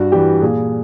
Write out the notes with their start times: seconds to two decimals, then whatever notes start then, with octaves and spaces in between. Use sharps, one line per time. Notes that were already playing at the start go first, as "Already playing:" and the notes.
Already playing: G2 F#4
0.12 E3 G3 G4
0.42 A#2 G#4